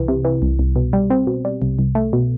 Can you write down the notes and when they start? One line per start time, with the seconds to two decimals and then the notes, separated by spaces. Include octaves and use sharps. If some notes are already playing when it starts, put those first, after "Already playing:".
Already playing: C2 E3
0.08 C3
0.25 E3
0.42 C2
0.59 C2
0.76 B2
0.93 G3
1.10 C4
1.27 B2
1.45 G3
1.62 C2
1.79 C2
1.95 A3
2.13 B2